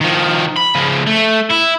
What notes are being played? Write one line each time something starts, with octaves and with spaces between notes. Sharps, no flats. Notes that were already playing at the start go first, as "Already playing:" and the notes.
D#3 F3
B5
C#3 F3
A3
E4